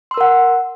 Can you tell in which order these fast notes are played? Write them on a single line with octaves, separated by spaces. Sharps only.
C6 E6 A#4 F#5